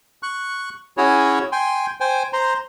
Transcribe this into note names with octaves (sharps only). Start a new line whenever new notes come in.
C#6 F#6
C#4 E4 F#4 G#4 C#5
G5 G#5 C6
C5 G5 G#5
C5 A#5 C6